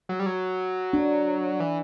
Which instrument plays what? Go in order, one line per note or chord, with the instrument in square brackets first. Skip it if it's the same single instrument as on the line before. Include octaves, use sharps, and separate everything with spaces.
[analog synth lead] F#3
G3
F#3
[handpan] D4
[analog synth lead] E3